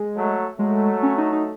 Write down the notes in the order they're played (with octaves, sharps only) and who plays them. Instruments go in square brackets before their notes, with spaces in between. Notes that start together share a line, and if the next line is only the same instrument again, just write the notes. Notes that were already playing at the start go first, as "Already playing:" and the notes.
Already playing: [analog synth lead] G#3
[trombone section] F#3 A3
[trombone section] F#3 A3 [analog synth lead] G#3
[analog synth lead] C#4
D#4
D#4